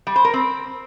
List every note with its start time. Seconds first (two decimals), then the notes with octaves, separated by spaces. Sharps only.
0.07 G3
0.16 C5
0.25 A#4
0.34 C4